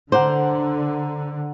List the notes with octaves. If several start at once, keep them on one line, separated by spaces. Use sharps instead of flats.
D3 C5 F#5 A#5 D6